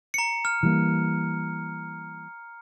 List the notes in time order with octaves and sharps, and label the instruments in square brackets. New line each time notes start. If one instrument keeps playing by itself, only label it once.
[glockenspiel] A#5 C#7
F6
[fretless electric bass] E3 G3 A#3